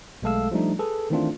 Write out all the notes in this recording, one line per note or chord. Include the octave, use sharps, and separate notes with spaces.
B1 G#3 A3 A4 F5 E6
F3 G3 A3 D4 D#4
G#4 A4 B4
D#3 E3 A3 C4 D4 F4